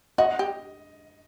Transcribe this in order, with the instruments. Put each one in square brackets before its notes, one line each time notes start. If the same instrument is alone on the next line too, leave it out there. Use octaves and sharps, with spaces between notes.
[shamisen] F#4 [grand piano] D#5
[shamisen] G4